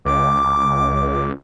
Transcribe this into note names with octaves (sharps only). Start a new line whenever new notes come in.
C#2 D6